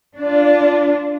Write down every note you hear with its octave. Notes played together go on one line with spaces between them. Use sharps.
D4 F4